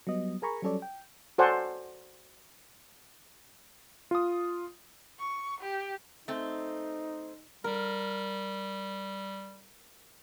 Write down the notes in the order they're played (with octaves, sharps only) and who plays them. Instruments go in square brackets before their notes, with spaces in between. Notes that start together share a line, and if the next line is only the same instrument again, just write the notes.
[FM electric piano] F#3 G3 B3 D#5
G#4 A#4 G#5 A#5 B5 C#6
F#3 G3 C#4 A4 C#5 D5
G5
[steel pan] F#4 A4 C5 D5 F#5 G#5
[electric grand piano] F4 D#6
[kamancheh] C#6
G4
[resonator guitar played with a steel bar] A3 C4 [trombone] D#4
[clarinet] G3 [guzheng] A#4